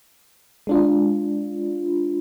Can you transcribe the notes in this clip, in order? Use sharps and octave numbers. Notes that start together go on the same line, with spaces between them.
G#3 D4 F4